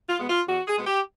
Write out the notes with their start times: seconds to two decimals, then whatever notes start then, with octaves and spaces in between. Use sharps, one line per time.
0.09 F4
0.19 B2 G#3 B3
0.28 F4
0.47 E2 F#4
0.67 G#4
0.76 B2 G#3 B3
0.86 G4